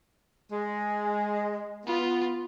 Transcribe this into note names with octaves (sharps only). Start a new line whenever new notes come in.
G#3
B3 F4